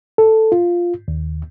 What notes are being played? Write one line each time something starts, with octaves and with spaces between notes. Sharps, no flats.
A4
F4
D#2